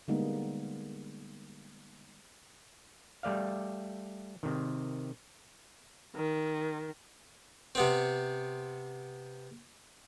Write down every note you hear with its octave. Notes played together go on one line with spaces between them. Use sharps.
D3 G3 G#3 A#3 B3 D#4
G3 A3 D5 F5
C3 D#3
D#3
C3 B3 C4